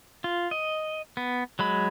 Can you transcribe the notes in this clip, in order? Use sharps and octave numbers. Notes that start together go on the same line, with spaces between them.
F4
D#5
B3
F#3 G#3 B5